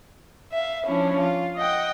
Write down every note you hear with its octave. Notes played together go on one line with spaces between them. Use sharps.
E5 F5
F3 C#4 D4 E4
F4
D#5 F#5 G5